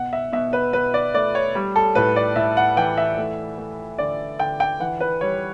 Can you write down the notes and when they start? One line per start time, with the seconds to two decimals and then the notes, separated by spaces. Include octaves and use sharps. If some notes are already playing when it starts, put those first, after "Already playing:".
Already playing: B2 F#5
0.13 E5
0.33 B2 E5
0.53 B4
0.73 B2 B4
0.94 D5
1.14 A3 D5
1.35 C#5
1.55 G3
1.76 A4
1.95 A2 B4
2.16 D5
2.36 A2 E5
2.57 F#5
2.77 E3 G5
2.98 E5
3.18 A3
3.58 A3
3.98 D3 D5
4.39 D3 G5
4.60 G5
4.80 E3 F#5
5.00 B4
5.21 G3 C#5